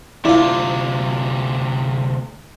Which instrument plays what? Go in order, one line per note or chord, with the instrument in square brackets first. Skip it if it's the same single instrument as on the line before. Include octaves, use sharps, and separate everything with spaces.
[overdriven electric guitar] D2 C3 [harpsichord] D4 F4 [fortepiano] E4